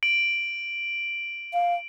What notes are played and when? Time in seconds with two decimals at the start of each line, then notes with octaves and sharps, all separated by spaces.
0.03 D7 F#7
1.53 F5